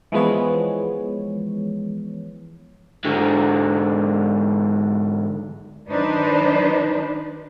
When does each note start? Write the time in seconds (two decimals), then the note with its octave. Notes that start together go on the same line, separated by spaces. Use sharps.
0.12 E3 F3 G#3 B3 C#5
3.05 G#2 D3
5.89 D#3 F#3 D4 D#4 B4 C5